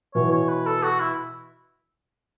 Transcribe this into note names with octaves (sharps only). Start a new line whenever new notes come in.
B2 E3 C#5
C#5
B4
A4
F#4
E4